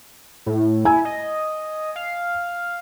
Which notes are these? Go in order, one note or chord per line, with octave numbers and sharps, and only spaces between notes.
A2
E4 G#5
D#5
F5